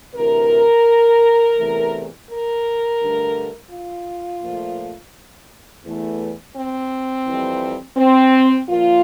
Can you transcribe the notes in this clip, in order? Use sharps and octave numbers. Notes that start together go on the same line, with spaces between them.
D2 C3 E3 A#4
E2 C3 E3 A3
A#4
G2 D3 A3
F4
A#2 F3 A3
E2 E3 A3
C4
F2 E3 G3
C4
A#2 F3 A#3 F4